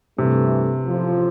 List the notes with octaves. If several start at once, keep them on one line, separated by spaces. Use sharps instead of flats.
G2 C3 E3 A3
A1 A2 F3